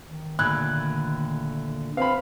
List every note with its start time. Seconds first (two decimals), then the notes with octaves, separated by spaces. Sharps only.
0.08 D#3
0.39 A#2 D3 A3 B5 E6 F#6 G#6
1.97 C4 B4 C5 F5 B5 F6